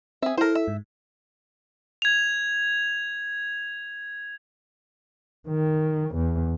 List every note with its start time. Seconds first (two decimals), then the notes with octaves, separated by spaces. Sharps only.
0.22 C4 G#4 E5
0.37 E4 A4 A#4 C5
0.55 E5
0.68 G#2
2.02 G#6 F7
5.48 D#3
6.15 E2